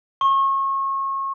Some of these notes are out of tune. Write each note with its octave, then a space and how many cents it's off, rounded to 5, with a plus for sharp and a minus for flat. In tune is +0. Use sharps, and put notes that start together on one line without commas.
C#6 -30